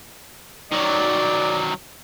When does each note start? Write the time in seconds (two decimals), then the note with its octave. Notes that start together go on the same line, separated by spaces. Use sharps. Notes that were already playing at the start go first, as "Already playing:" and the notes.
0.72 D#3 F#3 D5